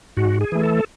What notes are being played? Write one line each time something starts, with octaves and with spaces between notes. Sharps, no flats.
G#2 F#4
G#4
E3 A3
A4